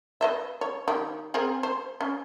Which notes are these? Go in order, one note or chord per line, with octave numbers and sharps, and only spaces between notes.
B4 D#5 E5
C#5
D#3 G4
C4 G#4 A#4
C5
C#4